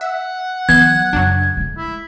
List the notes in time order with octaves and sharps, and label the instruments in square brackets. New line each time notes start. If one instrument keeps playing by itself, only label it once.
[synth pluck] E5 [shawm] F#5
[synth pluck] E3 B3 [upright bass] F#3 [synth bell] G#6
[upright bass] F#2 C#3 [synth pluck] F#3 D4
[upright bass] G#3 A3
[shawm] E4